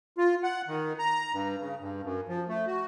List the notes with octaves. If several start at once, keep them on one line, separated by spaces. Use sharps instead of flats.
F4
F#5
D#3
A#5
G2
C#3
G2
F#2
F3
A3
F#4